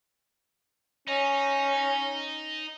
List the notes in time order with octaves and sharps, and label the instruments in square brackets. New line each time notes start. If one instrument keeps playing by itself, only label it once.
[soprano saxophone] C#4 [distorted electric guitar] D#4